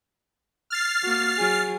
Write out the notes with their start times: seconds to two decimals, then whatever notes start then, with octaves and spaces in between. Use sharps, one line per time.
0.70 F6 A6 C7
1.03 A#3 F#4
1.37 F#3 G#4